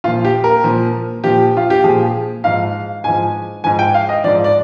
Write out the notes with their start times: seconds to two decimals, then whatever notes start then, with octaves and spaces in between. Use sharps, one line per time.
0.04 A#2 F3 F4
0.25 G4
0.44 A#4
0.64 A#2 F3
1.24 A#2 F3 G4
1.57 F4
1.70 G4
1.84 A#2 F3 G#4
2.44 G#2 F3 F5
3.04 G#2 F3 G#5
3.64 G#2 F3 G#5
3.79 G5
3.94 F5
4.09 D#5
4.24 G#2 F3 D5
4.44 D5